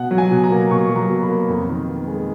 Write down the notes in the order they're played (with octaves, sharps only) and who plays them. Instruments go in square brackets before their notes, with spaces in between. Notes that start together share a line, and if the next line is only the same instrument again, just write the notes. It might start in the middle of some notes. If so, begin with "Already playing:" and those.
Already playing: [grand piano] B2 F#5
F#3
G#5
B2
A#5
A#3
B2 C#6
F#3
A#5
B2
B5
A#3
F2
D#3
B3
G#3